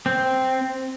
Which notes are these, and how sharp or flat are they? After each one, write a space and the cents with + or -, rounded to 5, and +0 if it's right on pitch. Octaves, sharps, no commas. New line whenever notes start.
C4 -5